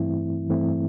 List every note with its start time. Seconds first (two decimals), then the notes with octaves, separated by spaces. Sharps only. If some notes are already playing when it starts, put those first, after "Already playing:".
Already playing: G2 E3 A3 C4 E4
0.49 G2 E3 A3 C4 E4